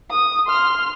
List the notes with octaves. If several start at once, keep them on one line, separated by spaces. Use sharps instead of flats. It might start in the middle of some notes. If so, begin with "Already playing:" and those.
D#6
C6 F6